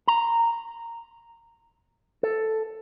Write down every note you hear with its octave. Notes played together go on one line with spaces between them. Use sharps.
A#5
A4